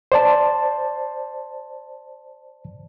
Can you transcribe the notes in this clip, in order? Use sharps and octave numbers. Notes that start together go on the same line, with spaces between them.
C5 D5 A5